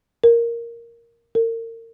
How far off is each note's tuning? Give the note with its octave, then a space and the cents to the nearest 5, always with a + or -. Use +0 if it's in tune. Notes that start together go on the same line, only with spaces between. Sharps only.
A#4 +0
A#4 -35